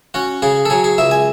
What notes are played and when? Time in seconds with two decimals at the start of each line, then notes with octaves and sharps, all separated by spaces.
0.14 C#4 F#4
0.42 C#3 G#4
0.66 A4
0.70 F#3 G#4
0.84 G#4
0.98 C#2 E5
1.11 G#5